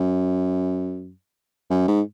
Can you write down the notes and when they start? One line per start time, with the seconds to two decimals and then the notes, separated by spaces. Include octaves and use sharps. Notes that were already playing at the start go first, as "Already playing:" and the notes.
Already playing: F#2
1.70 F#2
1.88 G#2